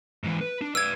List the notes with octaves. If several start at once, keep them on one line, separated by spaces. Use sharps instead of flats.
G#2 E3
B4
D4
B4 D5 E6 G#6